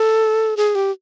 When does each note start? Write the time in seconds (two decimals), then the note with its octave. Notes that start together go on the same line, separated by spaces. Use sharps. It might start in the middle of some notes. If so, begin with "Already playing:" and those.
Already playing: A4
0.57 G#4
0.75 G4